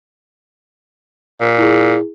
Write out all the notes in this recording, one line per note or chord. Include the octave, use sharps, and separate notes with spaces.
A#2
E4 G#4